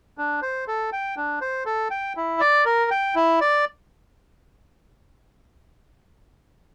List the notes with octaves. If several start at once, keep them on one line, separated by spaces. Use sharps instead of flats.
D4
C5
A4
G5
D4
C5
A4
G5
E4
D5
A#4
G5
E4
D5